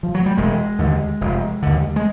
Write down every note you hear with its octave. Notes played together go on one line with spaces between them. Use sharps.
F3
F#3
G3
E1 G#3
D#2 D3
F1
D#2 D3
G#3